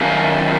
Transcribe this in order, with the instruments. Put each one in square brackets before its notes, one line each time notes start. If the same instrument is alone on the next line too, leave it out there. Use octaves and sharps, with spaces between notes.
[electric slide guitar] F#2 D#3 A3 C#4 F5